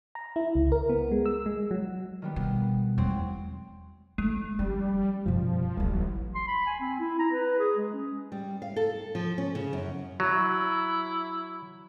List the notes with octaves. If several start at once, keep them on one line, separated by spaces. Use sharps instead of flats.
A#5
E4
C#2
A#4
B3
G#3
E6
G#3
F#3
D#3 G3 B3
B2
E2 F#3 G#3 C4
G#3 A3
F3 G3 C#4
F#2 B2 F3
D1 A1 F#3
C6
B5
G#5
C4
E4
A#5
B4
G#4
G#3
C#4
G3
F5
A4
F3
C#4
C#3
F#2
F#3 E4